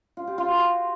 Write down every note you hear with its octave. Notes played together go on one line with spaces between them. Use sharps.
F4
G4
F4
F#4